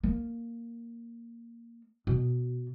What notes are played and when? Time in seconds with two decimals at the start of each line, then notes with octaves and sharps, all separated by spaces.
0.03 A#3
2.07 B2